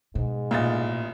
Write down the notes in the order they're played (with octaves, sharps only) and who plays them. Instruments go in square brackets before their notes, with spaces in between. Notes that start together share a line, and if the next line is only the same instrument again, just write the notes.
[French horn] G#2 [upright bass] B2
[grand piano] A1 D#5 A6 [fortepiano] A#2